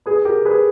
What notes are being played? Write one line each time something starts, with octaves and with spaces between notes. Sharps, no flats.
G#4 B4
G4 A#4
G#4 B4